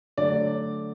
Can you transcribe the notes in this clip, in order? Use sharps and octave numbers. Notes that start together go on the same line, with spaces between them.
D3 F#3 A3 D5